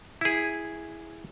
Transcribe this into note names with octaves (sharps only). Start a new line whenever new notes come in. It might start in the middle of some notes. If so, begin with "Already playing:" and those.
E4 G#4